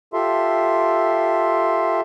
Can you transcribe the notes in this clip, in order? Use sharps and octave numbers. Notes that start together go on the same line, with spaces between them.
F4 G4 A4 E5 C6